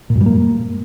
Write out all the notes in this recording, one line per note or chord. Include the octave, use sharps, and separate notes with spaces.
A#2
F#2
G3
A#3